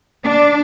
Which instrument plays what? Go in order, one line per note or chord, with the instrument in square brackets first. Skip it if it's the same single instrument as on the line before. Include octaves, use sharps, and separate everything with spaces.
[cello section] D4